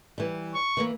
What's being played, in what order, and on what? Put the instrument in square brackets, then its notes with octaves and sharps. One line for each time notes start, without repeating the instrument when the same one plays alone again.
[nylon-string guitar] E3 G3
[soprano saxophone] C#6
[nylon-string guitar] E3 G3 A#3